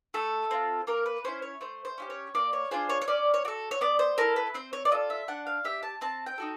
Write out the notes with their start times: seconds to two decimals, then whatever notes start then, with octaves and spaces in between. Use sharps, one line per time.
0.14 A3 A4
0.51 C4 F4
0.87 A#3 A#4
1.06 B4
1.24 C#4 E4 C5
1.42 C#5
1.61 A3 C5
1.85 C5
1.98 C#4 E4 G4
2.10 C#5
2.35 A#3 D5
2.53 C#5
2.71 D4 F4 G#4 C5
2.90 C#5
3.01 C#5
3.08 C#4 D5
3.34 C#5
3.45 F#4 D5
3.48 A4
3.71 C#5
3.81 B3 D5
3.99 C5
4.18 E4 A4 A#4
4.36 B4
4.55 C4 C5
4.73 C#5
4.85 D5
4.91 F4 A4 D#5
5.10 E5
5.28 D4 F#5
5.47 F5
5.65 G4 E5
5.83 A5
6.01 C4 A5
6.26 G5
6.38 D#4 F#4 A4